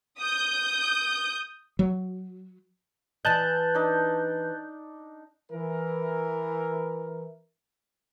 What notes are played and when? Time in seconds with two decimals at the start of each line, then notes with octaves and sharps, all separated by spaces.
0.20 D#6 G6
1.79 F#3
3.25 E3 D#5 A5 F#6 G6
3.75 D4 D#4
5.52 E3 A#4